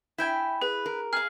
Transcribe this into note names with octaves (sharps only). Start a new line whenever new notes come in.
E4 E5 G5 G#5
G#4 B4
A#4
G#4 F5 F6